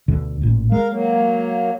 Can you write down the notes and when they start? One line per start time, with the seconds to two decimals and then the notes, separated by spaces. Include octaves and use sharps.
0.08 D2 B2 D3
0.42 A1 A#2
0.72 G#3 A#4 F5
0.90 F#3 A#3